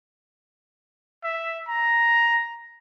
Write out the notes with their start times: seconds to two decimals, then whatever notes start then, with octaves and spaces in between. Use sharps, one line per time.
1.24 E5
1.68 A#5